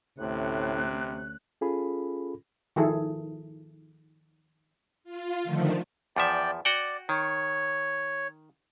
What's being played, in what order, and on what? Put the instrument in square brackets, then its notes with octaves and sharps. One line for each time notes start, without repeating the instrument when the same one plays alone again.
[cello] D2 C#4 [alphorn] A2 [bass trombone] C3 [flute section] F#6
[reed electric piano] C#4 F4 G#4 A4 B5
[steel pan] D#3 F3 E4 G#4 A4
[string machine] F4
D3 D#3 F3 A3
[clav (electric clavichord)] E2 F3 E5 [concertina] D5 G5
[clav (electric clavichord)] F#4 F#5 G5 [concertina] D5
[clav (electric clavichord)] D#3 [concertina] C#5